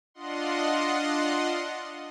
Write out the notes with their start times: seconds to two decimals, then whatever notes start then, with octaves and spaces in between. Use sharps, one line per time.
0.14 D4 F4 D#5 F#5 C6